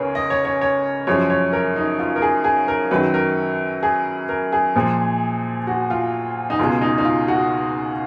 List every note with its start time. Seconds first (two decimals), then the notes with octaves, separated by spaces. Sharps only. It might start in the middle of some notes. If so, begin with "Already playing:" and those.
Already playing: C#2 C#3 G#3 G#4 A#4 B4 C#5
0.15 D#5
0.30 C#5
0.45 C#5
0.61 C#5
1.07 F#2 F3 G#3 C#5
1.30 C#5
1.53 A#4
1.76 D#4
1.99 F4
2.16 A#4
2.22 G#4
2.44 G#4
2.68 A#4
2.91 F#2 D#3 F#3 B4
3.14 A#4
3.83 G#4
4.29 A#4
4.52 G#4
4.75 A#2 F3 G#3
5.67 F#4
5.90 F4
6.50 D#4
6.59 C#2 B2 G#3 F4
6.81 D#4
6.98 D#4
7.05 F4
7.28 F#4